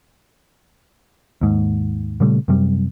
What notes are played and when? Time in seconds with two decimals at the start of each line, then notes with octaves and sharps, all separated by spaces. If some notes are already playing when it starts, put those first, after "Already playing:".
1.41 D#2 G#2
2.20 A#2 C#3 G3 A3
2.48 F#2 C3 G3